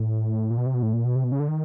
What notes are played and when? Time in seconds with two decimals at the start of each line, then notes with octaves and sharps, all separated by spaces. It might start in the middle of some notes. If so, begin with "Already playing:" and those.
Already playing: A2
0.51 A#2
0.58 B2
0.66 C3
0.74 B2
0.82 A2
0.93 A#2
1.05 B2
1.16 C3
1.24 B2
1.32 C#3
1.40 D3
1.48 D#3